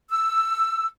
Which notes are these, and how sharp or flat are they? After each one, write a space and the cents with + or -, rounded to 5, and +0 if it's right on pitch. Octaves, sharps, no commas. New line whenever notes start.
E6 +10